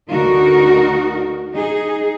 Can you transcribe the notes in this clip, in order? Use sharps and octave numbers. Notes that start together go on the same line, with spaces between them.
D2 D3 D#4 F#4 A#4
D#4 G#4